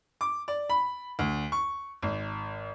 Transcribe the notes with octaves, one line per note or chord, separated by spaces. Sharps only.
D6
D5
B5
D2
C#6
G#1